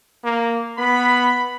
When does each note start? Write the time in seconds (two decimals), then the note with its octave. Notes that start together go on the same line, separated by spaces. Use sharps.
0.24 A#3
0.78 B3 B5